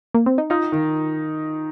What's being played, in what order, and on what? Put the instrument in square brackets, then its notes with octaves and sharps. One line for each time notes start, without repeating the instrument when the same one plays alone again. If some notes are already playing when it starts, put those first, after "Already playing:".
[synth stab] A#3
C4
D#4
[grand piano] D#4 [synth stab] F4
[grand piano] D#3